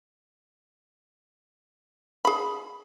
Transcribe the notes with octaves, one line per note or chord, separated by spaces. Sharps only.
G#4 B5